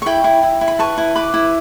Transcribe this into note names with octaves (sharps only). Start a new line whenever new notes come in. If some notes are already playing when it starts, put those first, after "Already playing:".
C#6
E4 G5 B5
E4
E4
E4
B5
B4 A5 C#6
E4
B4 B5 D6
E4